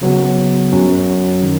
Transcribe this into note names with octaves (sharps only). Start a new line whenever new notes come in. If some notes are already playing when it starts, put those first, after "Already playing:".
C#3 F#3 B3
F#2 F#3 C#4
D#3